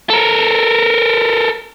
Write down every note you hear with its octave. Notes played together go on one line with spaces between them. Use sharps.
A4 A#4